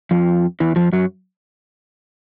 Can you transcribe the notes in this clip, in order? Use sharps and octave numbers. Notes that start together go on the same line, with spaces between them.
F2 F3
E2 E3
F2 F3
F#2 F#3